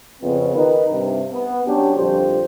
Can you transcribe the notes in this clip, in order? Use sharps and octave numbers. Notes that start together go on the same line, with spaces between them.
F2 C#3 B3 C4
D#3 D#4 A#4 B4
G2 C3
B3
F#3 C#4 D4 G4
A#1 F2 D3 G3 G4 C5